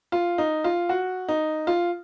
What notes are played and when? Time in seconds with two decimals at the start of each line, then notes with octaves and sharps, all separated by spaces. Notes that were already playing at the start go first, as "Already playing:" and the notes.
0.12 F4
0.38 D#4
0.64 F4
0.89 F#4
1.28 D#4
1.67 F4